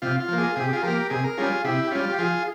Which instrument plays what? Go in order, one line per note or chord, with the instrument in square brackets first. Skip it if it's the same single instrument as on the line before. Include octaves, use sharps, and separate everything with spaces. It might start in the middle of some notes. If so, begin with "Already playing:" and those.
[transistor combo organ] C3 F4
F4
F3 A#3
F4 G#4
C3 G#4
G4
F4 G#4
F3 A#3 G4 A#4
C3 G#4
A#4
G3 C#4 F4 G#4
C3 E4 G4
G4
G3 C#4 F4
G4
F3 F4 G#4